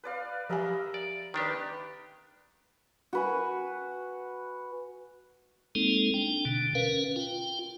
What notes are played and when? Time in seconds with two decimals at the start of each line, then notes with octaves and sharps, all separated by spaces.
0.04 B4 D5 F5
0.49 F3 G4 A#4 D#5 E5 G#5
0.94 D5
1.34 D#3 D4 G4 B4 D5
3.13 F#4 B4 G#5
5.75 G#3 A#3 C4 D#4 A4
6.14 D4 G5
6.45 B2 D3
6.75 C#4 A#4 B4 F5
7.16 F4 G5